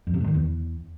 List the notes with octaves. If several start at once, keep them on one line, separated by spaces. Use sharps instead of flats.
F2
C3
A2
D#3
E2